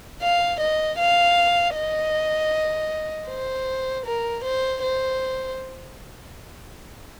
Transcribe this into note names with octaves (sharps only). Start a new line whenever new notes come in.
F5
D#5
F5
D#5
C5
A#4
C5
C5